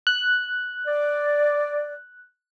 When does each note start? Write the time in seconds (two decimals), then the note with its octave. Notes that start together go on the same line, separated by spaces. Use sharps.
0.07 F#6
0.87 D5